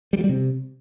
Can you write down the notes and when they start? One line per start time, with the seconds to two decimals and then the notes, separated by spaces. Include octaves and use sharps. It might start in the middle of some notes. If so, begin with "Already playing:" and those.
0.13 G3
0.18 F#3
0.24 G3
0.29 C3